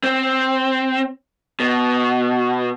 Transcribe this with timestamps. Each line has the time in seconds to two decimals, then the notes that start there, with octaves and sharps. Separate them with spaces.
0.04 C4
1.60 B2